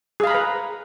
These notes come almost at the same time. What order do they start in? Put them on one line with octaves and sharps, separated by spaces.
G#4 F5 B5 A#5 B4